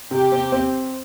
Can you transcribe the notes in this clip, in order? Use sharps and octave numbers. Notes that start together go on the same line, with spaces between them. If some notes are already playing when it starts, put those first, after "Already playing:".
C3 G4
C4
C4